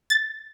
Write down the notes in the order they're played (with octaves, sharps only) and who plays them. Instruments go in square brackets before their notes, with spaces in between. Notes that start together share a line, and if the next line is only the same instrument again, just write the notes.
[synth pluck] A6